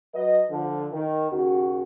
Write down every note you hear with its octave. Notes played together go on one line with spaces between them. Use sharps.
F#3 B4 D#5
D3 F3
D#3
D#2 C#3 F#4